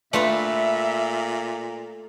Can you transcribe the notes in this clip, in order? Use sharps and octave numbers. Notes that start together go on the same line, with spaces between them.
A#2 A3 D4 F4 B4 E5